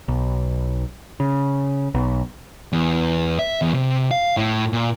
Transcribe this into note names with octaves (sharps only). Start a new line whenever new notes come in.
B1
C#3
B1
E2
E5
E2
C3
F5
A2
A#2